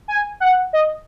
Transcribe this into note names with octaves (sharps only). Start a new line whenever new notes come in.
G#5
F#5
D#5